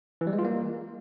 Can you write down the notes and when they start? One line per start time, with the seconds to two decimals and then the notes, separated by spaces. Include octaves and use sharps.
0.21 E3
0.27 G3
0.33 G#3
0.39 F4
0.45 A#3